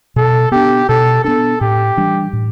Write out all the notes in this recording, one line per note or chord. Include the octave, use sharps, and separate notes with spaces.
B2 A4
B3 D4 G4
B2 A4
B3 D4 A4
A2 G4
E3 G3 D4
A2